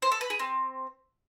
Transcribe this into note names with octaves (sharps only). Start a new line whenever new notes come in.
C5
A4
B4
G#4
C4